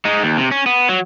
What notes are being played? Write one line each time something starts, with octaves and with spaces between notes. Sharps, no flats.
G#3 D#4
D#2
C3
C#4
B3
F#3